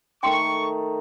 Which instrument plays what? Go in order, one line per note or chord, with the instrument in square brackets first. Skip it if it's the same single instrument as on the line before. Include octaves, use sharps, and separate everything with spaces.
[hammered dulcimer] D#3 A3 D#4 [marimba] G5 C6 [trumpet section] C#6